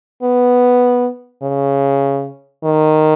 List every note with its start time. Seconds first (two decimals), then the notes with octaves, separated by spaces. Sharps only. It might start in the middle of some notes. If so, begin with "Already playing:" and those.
0.22 B3
1.43 C#3
2.64 D#3